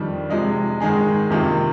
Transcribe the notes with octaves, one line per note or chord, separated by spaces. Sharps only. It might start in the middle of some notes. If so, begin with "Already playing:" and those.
Already playing: F2 D#3 G3 D4 G4
C3 F3 G#3 D#4
G#2 D#3 G#3 D#4 G#4
C3 D#3 A#3 F4